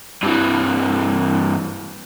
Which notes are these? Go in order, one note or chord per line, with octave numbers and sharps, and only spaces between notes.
G2 E3